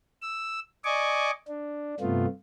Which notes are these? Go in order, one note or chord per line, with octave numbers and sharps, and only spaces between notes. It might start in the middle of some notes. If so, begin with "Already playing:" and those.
E6
D5 D#5 G#5 C#6 D6
D4
G2 C3 A3 B3 F4